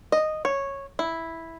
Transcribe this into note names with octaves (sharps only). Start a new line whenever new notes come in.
D#5
C#5
E4